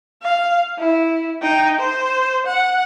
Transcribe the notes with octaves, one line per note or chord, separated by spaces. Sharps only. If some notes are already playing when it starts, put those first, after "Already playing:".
F5
E4
D#4 G5
C5
F#5